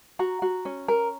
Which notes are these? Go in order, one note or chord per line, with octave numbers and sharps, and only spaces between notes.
F#4 A#5
F#4
C#4
A#4